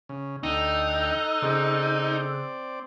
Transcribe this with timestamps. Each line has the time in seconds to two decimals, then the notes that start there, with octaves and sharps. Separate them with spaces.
0.09 C#3
0.43 D2 D#4 A4 G5 E6 F#6
1.42 C#3 C4 G#4 D5 G6